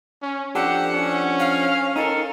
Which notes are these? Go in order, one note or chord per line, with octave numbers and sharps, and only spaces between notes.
C#4
F3 D4 G4 A4 F#5
C#4
F5
D#4 A4 A#4